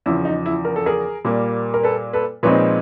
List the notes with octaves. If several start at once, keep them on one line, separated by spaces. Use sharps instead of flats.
E2 C#3 F3 E4
D#4
E4
A#4
A4
G#4 A#4
A#2 G3 A#3
A#4
A4 B4
A4 B4
A#2 F3 G#3 C4 D#4 B4 C#5